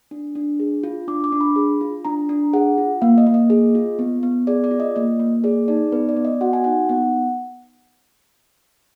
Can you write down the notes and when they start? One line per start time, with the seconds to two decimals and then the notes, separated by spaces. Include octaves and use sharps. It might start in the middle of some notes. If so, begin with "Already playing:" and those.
0.11 D4
0.35 D4
0.60 G#4
0.84 F4
1.08 D4 D6
1.24 D6
1.32 D4
1.41 B5
1.56 G#4
1.81 F4
2.05 D4 A#5
2.29 D4
2.53 G#4 F#5
2.78 F4
3.02 A#3 F5
3.18 D#5
3.27 A#3
3.34 D#5
3.50 G#4
3.75 F4
3.99 B3
4.23 B3
4.47 G#4 D5
4.64 D5
4.71 F4
4.80 D#5
4.96 A#3 D#5
5.20 A#3
5.44 G#4 D5
5.68 D#4 D5
5.92 B3 B4
6.09 D5
6.17 B3
6.25 D#5
6.41 F#4 F#5
6.53 G#5
6.64 D#4 F#5
6.89 B3 F#5